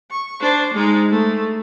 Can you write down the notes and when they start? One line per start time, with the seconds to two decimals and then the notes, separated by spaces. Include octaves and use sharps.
0.11 C#6
0.41 D4 C5
0.74 G#3 D#4
1.10 A3